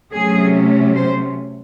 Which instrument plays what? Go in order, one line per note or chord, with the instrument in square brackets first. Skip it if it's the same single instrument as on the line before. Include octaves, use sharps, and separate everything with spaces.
[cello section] C3 F#3 A3 C#4 G#4
C5